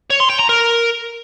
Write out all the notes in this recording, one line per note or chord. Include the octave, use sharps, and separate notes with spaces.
C#5
C6
G5
A#5
A#4